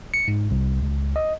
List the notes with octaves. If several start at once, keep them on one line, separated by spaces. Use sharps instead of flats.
C#7
G#2
C2
C#2
D#5